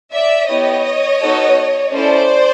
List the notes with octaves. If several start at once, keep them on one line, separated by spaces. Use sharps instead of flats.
D5 E5
B3 E4 G4 C#5 D#5
B3 D#4 F#4 A4
A3 C#4 E4 A4 C5 D5